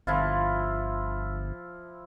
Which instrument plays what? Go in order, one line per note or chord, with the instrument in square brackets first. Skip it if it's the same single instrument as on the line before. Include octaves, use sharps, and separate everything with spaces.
[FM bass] G1 [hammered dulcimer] F3 E4 F4